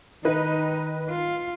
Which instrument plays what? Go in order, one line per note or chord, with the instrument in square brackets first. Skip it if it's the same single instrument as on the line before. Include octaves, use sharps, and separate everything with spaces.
[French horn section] D#3 [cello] D#4 [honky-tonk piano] B4 D#5
[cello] F4